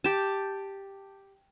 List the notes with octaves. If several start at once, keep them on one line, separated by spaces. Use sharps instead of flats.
G4 A5